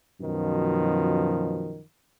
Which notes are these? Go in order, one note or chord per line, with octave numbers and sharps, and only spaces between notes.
F#2 B2 D#3 F3